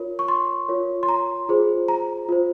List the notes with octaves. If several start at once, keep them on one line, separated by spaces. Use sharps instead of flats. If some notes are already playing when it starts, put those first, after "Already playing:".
Already playing: F4 A#4 C#5
C#6
C6
F4 A#4 C#5
C6
A#5
F4 G#4 C5
A#5
F4 C5